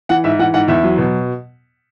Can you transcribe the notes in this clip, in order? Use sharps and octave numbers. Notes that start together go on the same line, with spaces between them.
E3 F#5
G#2 E5
E3 F#5
G#2 F#5
E2 E5
F#3
B2